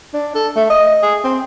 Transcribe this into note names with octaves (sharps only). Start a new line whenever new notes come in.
D4
A4
A3
D#5
G#4
C4